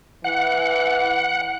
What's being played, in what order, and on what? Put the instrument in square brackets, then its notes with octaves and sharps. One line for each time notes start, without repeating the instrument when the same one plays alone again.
[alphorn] E3 [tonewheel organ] F#5